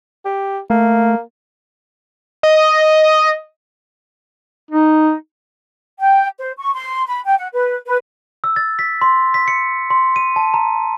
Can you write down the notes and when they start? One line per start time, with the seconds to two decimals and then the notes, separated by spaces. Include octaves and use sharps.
0.25 G4
0.70 A3 A#3
2.43 D#5
4.71 D#4
5.99 G5
6.38 C5
6.57 C#6
6.73 C6
7.07 B5
7.24 G5
7.37 F#5
7.52 B4
7.85 B4
8.44 E6
8.56 A6
8.79 B6
9.02 C6
9.34 B6
9.48 C#7
9.90 C6
10.16 D#7
10.36 A5
10.54 A#5